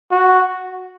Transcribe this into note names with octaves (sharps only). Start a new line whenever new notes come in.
F#4